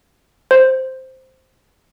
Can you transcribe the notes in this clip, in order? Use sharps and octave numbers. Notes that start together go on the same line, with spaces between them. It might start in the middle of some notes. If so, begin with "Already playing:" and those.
C5